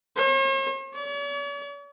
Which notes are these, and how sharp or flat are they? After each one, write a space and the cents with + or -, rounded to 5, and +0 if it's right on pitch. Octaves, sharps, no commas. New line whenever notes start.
C#5 -45
C#5 +45